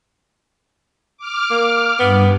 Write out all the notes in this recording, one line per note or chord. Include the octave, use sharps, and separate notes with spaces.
D6 F6
A#3
G2 B3